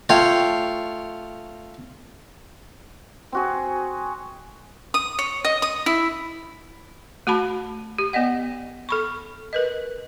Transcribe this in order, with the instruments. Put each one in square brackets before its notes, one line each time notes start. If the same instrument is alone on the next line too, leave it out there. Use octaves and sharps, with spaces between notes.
[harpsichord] A3 F4 C#5 F5 G5
[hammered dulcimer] C4 F#4 G#4
[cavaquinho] D#6
C#5
D#5
D#6
E4
[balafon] A3 F#4 A5 B5
G4
B3 D5 D#5 F#5
A4 B5 C#6
A#4 B4 D#5